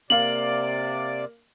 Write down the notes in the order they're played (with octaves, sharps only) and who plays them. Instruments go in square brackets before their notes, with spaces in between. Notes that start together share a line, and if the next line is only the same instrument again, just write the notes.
[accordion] C3 D5 [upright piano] A#3 F5 [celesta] F#7